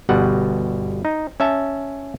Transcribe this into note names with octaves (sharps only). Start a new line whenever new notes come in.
G1 B2 G3 F#5
D#4
C#4 E5 A5